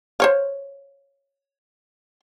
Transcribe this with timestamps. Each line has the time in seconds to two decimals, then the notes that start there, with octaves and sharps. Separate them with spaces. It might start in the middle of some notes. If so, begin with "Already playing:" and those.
0.20 C5 C#5 F5